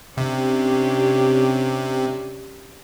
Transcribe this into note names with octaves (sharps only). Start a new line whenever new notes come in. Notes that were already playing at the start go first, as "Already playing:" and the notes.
C3 C#4 D4 G4